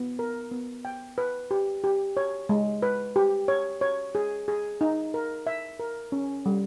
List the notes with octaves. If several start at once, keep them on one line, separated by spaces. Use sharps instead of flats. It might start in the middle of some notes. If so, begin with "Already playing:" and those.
Already playing: B3
A#4
B3
G5
B4
G4
G4
C#5
G#3
B4
G4
C#5
C#5
G#4
G#4
D#4
A#4
E5
A#4
C#4
G3